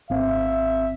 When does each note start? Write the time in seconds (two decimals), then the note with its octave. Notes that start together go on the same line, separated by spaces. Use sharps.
0.10 G#1 C4 E5 F5